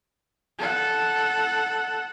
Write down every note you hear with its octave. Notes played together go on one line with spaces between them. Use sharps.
A4 F#5